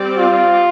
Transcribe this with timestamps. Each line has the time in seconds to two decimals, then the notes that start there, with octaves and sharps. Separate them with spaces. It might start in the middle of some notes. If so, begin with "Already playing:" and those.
Already playing: G3 C4 G4 D5
0.17 F4